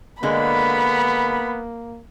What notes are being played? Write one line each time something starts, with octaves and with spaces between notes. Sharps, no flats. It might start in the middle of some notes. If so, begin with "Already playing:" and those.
D3 G#3 A#3 B3 B5